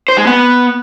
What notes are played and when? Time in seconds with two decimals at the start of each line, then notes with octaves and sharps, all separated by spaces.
0.08 C5
0.18 G#3
0.27 B3